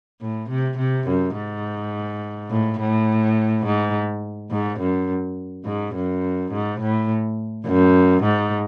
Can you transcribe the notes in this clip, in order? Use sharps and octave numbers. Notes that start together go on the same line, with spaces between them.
A2
C3
C3
F#2
G#2
A2
A2
G#2
G#2
F#2
G#2
F#2
G#2
A2
F#2
G#2